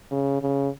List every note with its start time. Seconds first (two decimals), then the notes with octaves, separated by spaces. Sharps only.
0.12 C#3
0.42 C#3